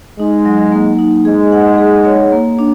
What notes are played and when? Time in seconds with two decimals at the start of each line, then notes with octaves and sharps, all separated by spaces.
0.19 G#3 D#4
0.45 F#3
0.72 A#3
0.99 D#4
1.25 G#3 G#4
1.52 F#5
1.78 G#4
2.05 C#5
2.32 A#3
2.59 D4